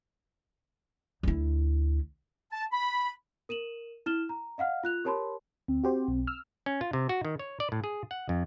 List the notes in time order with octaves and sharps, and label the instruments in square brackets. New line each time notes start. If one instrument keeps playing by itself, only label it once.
[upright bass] D2 E4
[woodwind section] A5
B5
[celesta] A#4 D#7 E7 F#7
E4 F6 E7 G7
A#5
D#5 F5 F#5 F6
F4 F#6 F7
G4 A#4 C#5 A5 B5 C6
[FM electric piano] D2 [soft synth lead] C4
[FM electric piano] F#4 G4 C5
B1
E6 F6
[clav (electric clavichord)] C#4
F4
C3
F#4
D#3
C#5
D5
A2
G#4
F#5
F2